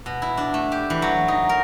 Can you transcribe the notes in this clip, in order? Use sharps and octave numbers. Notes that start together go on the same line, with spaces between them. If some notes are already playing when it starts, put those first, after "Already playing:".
B2
E4
D4
A3
G4
E3
F#3
D#4
A#4